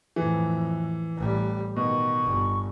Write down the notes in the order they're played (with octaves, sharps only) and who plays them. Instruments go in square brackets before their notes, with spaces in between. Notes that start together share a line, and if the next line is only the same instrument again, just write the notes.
[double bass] F2 A2 [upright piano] E3
[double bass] A1 G3
[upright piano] B2 [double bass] D#3 [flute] C#6
[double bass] G1